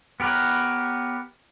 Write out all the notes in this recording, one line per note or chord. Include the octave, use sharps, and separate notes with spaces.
B3 G4 A#4 B4 C#5